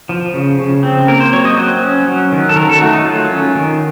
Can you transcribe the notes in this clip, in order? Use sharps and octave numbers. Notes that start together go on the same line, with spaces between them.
F3
C#3
C#3
C4
A#3 A#4
C5
F#3 C#5
D#5
F#3 C5
C#4
F#3
D#3
A4
D#3 A#4
A4
A3 F#4
D#4
F#3 F4
C#4
D#3